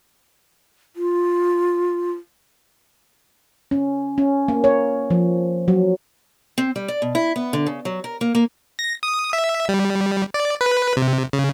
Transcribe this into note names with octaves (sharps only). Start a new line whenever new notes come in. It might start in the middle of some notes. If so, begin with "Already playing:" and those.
F4
C#4
C#4
A#3
C#5
F3
F#3
C4
G3
D5
B2
E4
B3
D3
C#3
F#3
A#4
A#3
A#3
A#6
D#6
E5
G3
D5
B4
C3
C#3